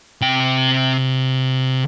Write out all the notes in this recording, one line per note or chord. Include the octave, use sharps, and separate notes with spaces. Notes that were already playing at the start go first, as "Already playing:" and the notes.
C3 G5